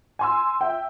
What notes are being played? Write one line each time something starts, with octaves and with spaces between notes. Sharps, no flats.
G#5 C6 E6
E5 G5